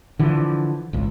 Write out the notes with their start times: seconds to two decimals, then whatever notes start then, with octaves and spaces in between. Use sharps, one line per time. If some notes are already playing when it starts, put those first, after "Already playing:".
0.19 D3 E3 F3
0.93 G#1 C#2